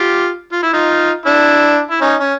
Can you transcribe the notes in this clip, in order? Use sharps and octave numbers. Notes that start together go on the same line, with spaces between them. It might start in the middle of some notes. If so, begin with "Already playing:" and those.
Already playing: F4 G4
F4
E4
D#4 F4
D4 E4
E4
C#4 D#4
C#4